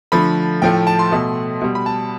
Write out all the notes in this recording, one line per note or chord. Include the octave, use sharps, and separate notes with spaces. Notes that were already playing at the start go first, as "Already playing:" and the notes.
D3 F3 A3 B5
A2 F3 A3 G5
A5
C6
B2 A3
B2 G3
B5
A5